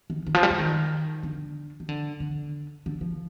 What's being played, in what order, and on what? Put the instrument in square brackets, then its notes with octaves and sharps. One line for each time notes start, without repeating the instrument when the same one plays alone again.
[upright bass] D#3
D#3
F3
G3
G#3
D#3
D3
D#3
D3
D3
D3
F3